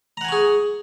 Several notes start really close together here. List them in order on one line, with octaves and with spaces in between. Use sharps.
A#5 F#5 G#5 C#6 G#4